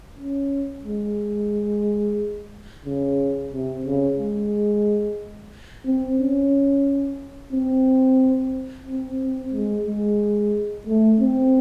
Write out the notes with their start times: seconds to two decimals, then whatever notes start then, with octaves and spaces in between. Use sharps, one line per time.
0.18 C#4
0.85 G#3
2.85 C#3
3.52 C3
3.85 C#3
4.19 G#3
5.86 C4
6.19 C#4
7.53 C4
8.86 C4
9.20 C4
9.53 G#3
9.86 G#3
10.87 A3
11.20 C4